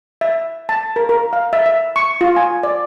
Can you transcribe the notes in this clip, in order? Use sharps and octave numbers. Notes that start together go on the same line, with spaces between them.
E5
A5
A#4
A#4
F5
E5
E5
C#6
F4
G#5
D5